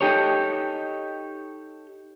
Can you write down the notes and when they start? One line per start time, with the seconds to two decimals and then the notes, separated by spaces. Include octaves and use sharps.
0.01 D#4 G4 A4 C#5